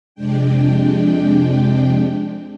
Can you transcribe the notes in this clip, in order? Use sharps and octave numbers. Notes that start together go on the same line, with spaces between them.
F2 C3 G#3 D4 G5